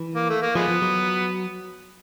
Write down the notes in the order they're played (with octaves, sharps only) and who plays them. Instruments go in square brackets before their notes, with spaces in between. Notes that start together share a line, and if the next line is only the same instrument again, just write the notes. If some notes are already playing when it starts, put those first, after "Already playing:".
Already playing: [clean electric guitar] E3
[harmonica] A#3
A3
A#3
[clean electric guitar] F3 [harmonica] G#3 B3
[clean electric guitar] F3
F#3